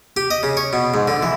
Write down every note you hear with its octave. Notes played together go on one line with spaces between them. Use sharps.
G4
D#5
C#3
C#5
B2
G#2
D3
E3